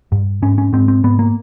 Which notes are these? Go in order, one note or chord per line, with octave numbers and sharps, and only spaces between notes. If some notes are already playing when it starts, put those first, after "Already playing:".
G2
G#2 C#4
C#4
G#2 C4
C4
G#2 B3
A#3